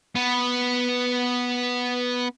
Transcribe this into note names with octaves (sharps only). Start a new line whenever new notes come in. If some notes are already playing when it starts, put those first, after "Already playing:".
B3